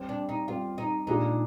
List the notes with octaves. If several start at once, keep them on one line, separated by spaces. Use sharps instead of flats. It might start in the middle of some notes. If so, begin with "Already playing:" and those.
Already playing: G3 C4 G4
D4
D#4
G3 C4 F4 G4
D#4
A#2 G#3 D4 D#4 F4 G#4